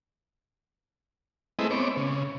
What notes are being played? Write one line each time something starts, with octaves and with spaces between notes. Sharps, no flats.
G#3 A3 C4 E4 B4 D#5
B3 C4 C#5 D6
C#3